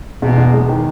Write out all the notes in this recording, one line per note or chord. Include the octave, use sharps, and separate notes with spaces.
E2 B2
E2
G#3
D#3